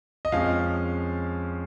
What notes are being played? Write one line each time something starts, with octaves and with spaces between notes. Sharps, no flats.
D#5
F2 F3 G#3 C#4 F5